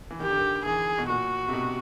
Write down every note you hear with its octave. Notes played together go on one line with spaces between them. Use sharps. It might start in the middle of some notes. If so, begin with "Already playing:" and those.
E3
D#3 G4
D3
D#3
E3 G#4
B2
A#2 F#4
C3
B2